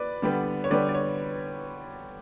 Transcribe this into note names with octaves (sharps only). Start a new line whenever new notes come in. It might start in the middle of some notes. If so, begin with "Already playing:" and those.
Already playing: B4 D5
D3 G3 B3
C#5
D3 G3 B3 B4 D5
D5
C#5